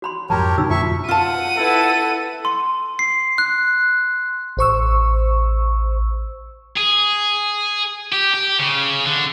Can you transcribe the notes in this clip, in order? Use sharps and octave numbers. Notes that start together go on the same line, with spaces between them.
F#4 B5 C6
F2 G#2 F3 G4 A#4 C#5 A5 A#5
B2 D3 D#4 F#4 E6
F#2 A#3 F4 E5 C#6
F4 F#5 A5 D#7
E4 A4 B4
C6
C7
F#6
A1 C5 C#6 E6
G#4
G4
G4
C#3
D3